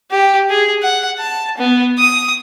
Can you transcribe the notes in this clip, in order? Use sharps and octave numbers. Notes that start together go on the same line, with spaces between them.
G4
G#4
F#5
A5
B3
D#6